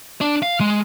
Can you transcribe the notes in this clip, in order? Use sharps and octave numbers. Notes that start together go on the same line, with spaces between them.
D4 D5
F5
G#3